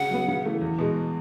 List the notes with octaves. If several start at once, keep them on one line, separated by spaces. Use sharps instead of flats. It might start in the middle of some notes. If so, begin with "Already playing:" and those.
Already playing: C#3 F#5
F#3 B3
C#3
E3 A3
E2
B2 G#3